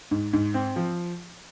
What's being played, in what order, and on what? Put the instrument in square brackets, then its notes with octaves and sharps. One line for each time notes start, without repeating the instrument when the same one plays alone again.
[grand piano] G#2
G#2
C4
F3